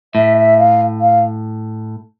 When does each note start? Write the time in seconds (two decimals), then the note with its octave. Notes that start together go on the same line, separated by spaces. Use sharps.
0.15 A2 E5
0.37 E5
0.58 F5
1.01 F5